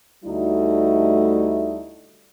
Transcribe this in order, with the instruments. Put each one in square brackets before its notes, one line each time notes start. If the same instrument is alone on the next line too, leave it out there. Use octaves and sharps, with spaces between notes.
[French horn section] D2 G3 A3 D#4 E4 F#4